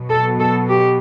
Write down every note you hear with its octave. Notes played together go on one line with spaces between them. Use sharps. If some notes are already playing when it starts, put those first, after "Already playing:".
Already playing: B2 F#3
A4
A4
G4